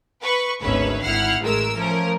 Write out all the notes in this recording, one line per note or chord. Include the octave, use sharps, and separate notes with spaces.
B4 C#6
G#1 D2 C#4 B4 C#5 E5
G#1 E4 F#5 F6 C7
A1 G#3 A3 A#4 E6
F3 A3 C#4 A#4